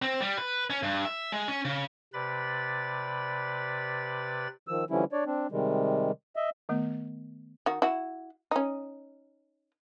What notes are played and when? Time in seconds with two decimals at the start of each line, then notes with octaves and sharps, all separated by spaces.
0.02 C4
0.22 G3
0.38 B4
0.70 C#4
0.83 G2
1.05 E5
1.32 G#3
1.48 C#4
1.65 C#3
2.14 C3 B4 D5 B5 A6
4.68 D#3 F3 E6
4.90 D3 E3 F3 G3 C#4 E4
5.12 D4 C#5 D5
5.26 C4 D4
5.51 C3 D#3 G3 G#3
6.36 D#5 E5
6.69 D#3 A3 B3
7.66 D#3 F#4
7.82 E4 F#4
8.51 C#4 D#4